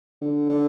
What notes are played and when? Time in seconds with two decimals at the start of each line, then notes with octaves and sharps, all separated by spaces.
0.22 D3
0.49 D3